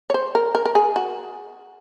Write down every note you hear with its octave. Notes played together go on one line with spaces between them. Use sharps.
C#5
C5
A#4
A#4
A#4
G#4
F#4